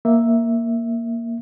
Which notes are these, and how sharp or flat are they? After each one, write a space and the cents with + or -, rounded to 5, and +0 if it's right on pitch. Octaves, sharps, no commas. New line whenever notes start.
A#3 +0 E5 +0